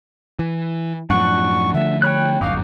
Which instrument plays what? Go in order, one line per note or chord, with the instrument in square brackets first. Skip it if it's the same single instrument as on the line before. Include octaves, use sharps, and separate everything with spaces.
[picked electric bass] E3
[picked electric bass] F#2 A2 F3 [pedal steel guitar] D4 F#5 [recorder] C#6
[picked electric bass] D3 F3 A3 [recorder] E5
[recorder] C#5 [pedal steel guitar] G5 B5 F#6
[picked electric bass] D1 G1 F#2 [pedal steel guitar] D#4 F#4 D6 [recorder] F5